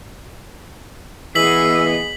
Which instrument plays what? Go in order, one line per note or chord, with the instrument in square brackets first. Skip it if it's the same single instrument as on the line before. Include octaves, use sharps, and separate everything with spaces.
[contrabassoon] E3 [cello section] B3 G#4 D#5 [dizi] E6 [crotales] B6 F#7